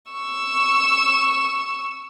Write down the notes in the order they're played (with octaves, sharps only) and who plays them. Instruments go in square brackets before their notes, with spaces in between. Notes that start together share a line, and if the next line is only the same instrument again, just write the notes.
[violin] C#6 E6